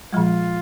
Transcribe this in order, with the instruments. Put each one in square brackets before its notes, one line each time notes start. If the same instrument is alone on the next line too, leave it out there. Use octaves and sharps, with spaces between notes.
[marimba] A#2 F3 G#3 [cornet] F4